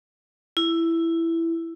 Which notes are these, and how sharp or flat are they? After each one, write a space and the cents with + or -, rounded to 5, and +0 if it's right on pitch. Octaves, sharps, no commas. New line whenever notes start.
E4 +10